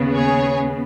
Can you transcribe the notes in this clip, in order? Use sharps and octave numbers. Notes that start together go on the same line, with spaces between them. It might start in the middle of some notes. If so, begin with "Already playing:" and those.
Already playing: D#2 C#3 B3
G#4 C#5